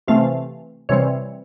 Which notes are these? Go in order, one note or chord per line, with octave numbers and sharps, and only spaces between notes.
C3 E3 A3 C4 F5
C3 E3 G3 C4 C#5